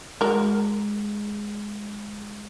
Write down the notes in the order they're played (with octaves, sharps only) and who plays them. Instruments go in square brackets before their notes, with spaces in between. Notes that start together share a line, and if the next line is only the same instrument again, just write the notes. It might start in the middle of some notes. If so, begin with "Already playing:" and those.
[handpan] G#3 [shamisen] F#4 A#4